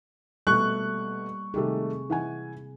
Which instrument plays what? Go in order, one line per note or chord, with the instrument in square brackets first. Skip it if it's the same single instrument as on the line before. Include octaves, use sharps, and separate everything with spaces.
[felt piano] B2 A3 [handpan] G3 A#3 [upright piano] C#6 F#6
[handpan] C3 G#4 [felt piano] D#3 G3 A3
[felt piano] E3 F#5 G#5